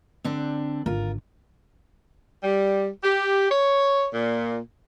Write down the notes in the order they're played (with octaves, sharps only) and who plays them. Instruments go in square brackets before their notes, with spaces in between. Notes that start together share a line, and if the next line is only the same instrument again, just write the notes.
[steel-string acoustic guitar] D3 C4 D4
[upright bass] G#1 D3 [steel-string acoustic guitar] F4 A#4
[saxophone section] G3
G4
C#5
A#2